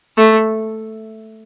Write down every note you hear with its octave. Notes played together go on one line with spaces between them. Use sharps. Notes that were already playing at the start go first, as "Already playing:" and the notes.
A3